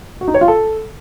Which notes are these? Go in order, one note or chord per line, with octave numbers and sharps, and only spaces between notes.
F#4
D#4
C#5
F4
A4